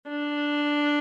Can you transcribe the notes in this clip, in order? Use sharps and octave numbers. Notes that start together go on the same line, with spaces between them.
D4